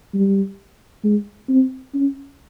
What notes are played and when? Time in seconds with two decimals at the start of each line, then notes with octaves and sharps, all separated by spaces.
0.14 G3
1.04 G#3
1.49 C4
1.94 C#4